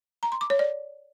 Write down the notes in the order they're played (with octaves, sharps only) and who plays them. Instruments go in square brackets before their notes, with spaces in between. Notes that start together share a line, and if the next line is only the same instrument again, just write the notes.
[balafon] A#5
C6
D6
C#5
D5